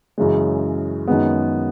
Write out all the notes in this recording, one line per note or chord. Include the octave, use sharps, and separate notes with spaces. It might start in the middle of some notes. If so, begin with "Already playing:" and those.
F#2 C#3 E3 G#3
F#2 D#3 G#3 B3